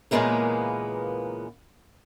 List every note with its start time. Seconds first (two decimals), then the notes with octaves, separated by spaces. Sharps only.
0.11 A#2 C#3 E3 G#3 A#3 B3